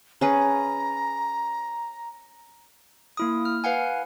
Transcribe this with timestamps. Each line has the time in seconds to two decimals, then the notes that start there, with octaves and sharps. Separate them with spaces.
0.21 C#4 G#4 B4 A#5
3.17 A#3 E4 D#6
3.45 F6
3.64 B4 F5 F#5 G#5